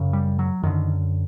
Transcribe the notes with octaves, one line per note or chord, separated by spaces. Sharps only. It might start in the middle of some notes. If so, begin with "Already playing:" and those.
Already playing: F#2 C#3
G3
F#3
F#2 D3 D#3